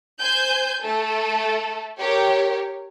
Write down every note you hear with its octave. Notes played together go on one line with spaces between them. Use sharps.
C5 G#5 G6
A3 A4
G4 A#4 C#5